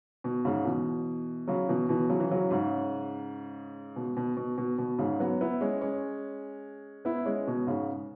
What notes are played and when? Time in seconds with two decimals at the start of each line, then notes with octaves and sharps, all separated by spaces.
0.24 B2
0.45 G#2 C#3
0.65 B2 E3
1.47 C#3 F#3
1.68 B2 E3
1.89 B2 E3
2.09 C#3 F#3
2.20 E3
2.31 C#3 F#3
2.51 G#2 C#3
3.96 B2
4.17 B2
4.37 B2
4.58 B2
4.78 B2
4.99 G#2 C#3
5.20 F#3 B3
5.41 B3 E4
5.61 G#3 C#4
5.81 G#3 C#4
7.05 B3 E4
7.26 G#3 C#4
7.47 B2
7.67 G#2 C#3